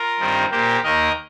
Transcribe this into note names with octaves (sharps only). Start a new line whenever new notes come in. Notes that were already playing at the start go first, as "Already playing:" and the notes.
Already playing: F4 A#4
G2 D#3 G3 C4
A#2 A#3 G4 C5
D#2 D#3 A#3 A#4 D#5